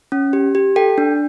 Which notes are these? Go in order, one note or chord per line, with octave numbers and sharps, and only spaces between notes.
C#4
G4
G4
A4 G5
D4